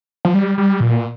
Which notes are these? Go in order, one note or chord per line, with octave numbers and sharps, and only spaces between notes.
F3
G3
G3
A#2